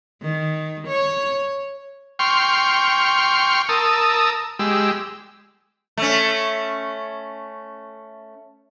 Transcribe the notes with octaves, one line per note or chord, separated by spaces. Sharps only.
D#3
C#5
G5 C6 C#6 F6
A#4 A5 D#6 E6
G#3 G4 E6
A3 C#4